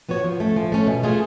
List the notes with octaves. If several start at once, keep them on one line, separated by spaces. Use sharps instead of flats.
F3 B3 F#4 C#5
F3
A3 C#4
F3
A3 C#4
B2
A3 F4 G#4